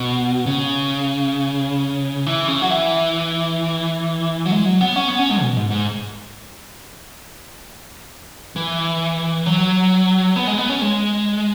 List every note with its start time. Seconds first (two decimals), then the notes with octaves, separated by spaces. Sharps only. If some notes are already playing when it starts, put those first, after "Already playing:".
Already playing: B2
0.46 C#3
2.26 E3
2.48 C#3
2.62 F#3
2.70 E3
4.46 F#3
4.51 G#3
4.66 F#3
4.81 B3
4.96 C#4
5.08 B3
5.19 C#4
5.30 G#3
5.42 B2
5.57 G#2
5.71 G#2
8.56 E3
9.46 F#3
10.36 B3
10.47 G#3
10.58 B3
10.70 C#4
10.82 G#3